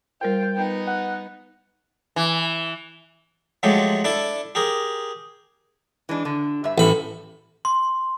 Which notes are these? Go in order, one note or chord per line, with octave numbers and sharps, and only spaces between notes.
G3 F4 A#4 C5 G5
B3 D#4
F#5
E3
F3 F#3 G#3 A3 G4
D4 E4 A4 A5
G4 G#4 A#4
E3 G#3 D4
D3
G2 E5
A1 A2 G3 A4 B5
C6